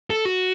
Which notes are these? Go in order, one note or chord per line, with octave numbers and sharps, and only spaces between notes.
A4
F#4